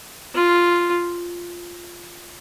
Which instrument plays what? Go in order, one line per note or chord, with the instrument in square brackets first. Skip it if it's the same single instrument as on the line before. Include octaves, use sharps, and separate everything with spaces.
[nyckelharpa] F4